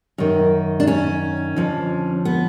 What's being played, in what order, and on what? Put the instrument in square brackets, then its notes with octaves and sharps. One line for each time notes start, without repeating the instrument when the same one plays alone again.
[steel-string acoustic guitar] F#2 D#3
D4
C#4
F2 D3 F3
B3